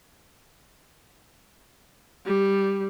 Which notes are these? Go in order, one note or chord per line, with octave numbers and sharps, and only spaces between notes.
G3